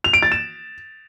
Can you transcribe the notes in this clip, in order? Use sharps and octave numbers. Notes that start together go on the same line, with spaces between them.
F7
D7
A6
E7